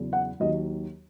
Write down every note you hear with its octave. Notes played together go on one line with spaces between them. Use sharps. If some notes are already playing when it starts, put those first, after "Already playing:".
Already playing: E2 C#3 F#3
F#5
D#2 D#3 F#3 D#5